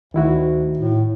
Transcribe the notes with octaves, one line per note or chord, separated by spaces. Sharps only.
D2 D#3 E4 F#4
A2